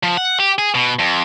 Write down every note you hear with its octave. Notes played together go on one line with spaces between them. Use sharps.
F3
F#5
G4
G#4
B2
F2